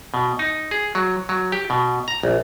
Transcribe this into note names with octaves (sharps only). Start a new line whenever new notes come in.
B2
D#4
G#4
F#3
F#3
G4
B2
A#5
A#1